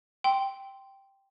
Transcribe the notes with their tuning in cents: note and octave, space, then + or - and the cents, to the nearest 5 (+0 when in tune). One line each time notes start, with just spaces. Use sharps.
G5 +0 C6 +0